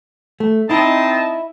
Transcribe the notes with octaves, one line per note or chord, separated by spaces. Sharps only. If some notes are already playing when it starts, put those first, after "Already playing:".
A3
C4 D#4 E4 D#5 A5